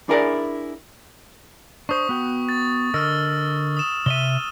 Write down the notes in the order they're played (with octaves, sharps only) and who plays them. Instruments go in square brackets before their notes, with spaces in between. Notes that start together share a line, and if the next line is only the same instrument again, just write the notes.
[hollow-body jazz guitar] D4 E4 G#4 A#4 B4 D5
[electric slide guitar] D4 C5 [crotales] C#6 D#6
[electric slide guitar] B3 F#4 G5
[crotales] A6
[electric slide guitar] D3 A#4 D#5 [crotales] E6 F6 A6
[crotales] D#6 E7
[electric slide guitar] C3 D5 E5 [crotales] D#7 G7